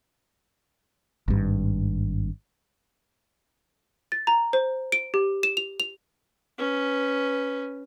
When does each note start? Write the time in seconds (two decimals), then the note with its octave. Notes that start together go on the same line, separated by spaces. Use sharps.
1.28 G#1 G2
4.12 A6
4.27 A#5
4.53 C5
4.92 D7
5.14 G4
5.43 E7
5.57 F7
5.80 F7
6.58 C#4 B4